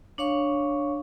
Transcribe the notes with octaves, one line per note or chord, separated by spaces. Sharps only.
D4 C#5 F5 C#6